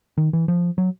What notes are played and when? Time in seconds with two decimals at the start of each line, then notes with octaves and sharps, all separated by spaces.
0.18 D#3
0.33 E3
0.48 F3
0.78 F#3